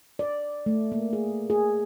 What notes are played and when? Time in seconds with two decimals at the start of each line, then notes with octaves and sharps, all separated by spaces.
0.19 D5
0.66 A3
0.92 A#3
1.13 G#4
1.50 G#4